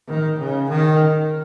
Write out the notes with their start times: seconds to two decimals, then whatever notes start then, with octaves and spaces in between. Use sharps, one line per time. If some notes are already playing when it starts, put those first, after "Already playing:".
0.08 D#3
0.39 C#3
0.69 D#3